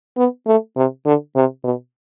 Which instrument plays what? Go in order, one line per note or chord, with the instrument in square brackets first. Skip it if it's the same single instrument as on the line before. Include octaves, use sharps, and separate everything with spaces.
[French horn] B3
A3
C3
D3
C3
B2